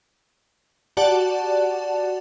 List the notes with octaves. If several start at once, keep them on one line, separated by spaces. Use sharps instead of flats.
F#4 G4 D5 F#5 A5